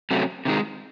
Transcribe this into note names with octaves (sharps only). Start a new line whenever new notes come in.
C3 F#3 A3 C#4
C3 D#3 G#3